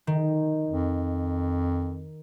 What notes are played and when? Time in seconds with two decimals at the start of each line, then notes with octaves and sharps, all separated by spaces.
0.07 D#3
0.69 F2